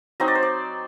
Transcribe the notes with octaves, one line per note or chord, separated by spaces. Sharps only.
F#3 C4 D#4 D#5
D5
C5
D5